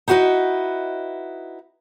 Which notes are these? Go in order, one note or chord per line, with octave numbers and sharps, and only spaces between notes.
D#4 E4 F#4 A4 B4 D#5